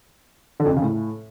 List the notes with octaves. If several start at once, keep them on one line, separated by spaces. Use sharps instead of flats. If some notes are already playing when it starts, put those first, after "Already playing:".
D3
F2
C3
C#3
A2